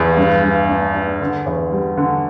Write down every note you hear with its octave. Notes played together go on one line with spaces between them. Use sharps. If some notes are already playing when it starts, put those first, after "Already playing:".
Already playing: E2
G2
G2
D4
D4
D3
E2
G3
D3